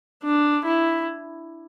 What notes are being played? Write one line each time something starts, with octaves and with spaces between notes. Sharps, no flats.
D4
E4